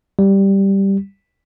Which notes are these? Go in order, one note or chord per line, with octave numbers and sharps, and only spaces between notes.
G3